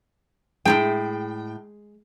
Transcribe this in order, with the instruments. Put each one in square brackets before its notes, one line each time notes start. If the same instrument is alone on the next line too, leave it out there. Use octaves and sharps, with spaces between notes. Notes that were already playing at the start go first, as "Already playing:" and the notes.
[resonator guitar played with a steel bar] A2 D#4 G5 [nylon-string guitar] G#3